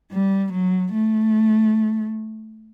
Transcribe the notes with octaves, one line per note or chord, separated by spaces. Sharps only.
G3
F#3
A3